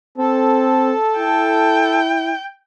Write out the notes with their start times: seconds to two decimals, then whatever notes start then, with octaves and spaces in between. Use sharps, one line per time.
0.17 C4 A4
1.18 E4 G5